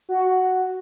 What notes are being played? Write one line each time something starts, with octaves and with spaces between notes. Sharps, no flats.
F#4